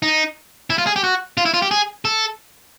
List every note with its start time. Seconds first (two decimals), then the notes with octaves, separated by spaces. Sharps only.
0.03 D#4
0.70 E4
0.78 F4
0.87 G#4
0.96 G4
1.04 F#4
1.38 F4
1.45 E4
1.54 F4
1.62 G4
1.71 G#4
2.05 A4